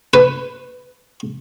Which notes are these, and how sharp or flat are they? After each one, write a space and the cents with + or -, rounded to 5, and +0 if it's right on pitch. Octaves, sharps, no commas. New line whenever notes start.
B4 +10